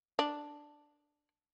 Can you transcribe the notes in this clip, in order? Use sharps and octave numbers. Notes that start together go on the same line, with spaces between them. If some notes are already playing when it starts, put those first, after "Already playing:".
D4